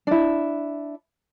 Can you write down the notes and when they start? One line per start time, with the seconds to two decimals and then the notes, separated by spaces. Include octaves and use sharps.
0.07 D4 E4